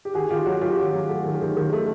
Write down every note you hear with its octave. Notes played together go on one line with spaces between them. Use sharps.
G4
D#3 F#4 G#4
D#3 F4 G4
F#3 F#4
D#3 F4 G4
F#3
F#3
A3
D#3
D#3
D#3
A3